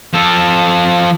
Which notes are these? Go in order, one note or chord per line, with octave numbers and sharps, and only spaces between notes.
F3 A4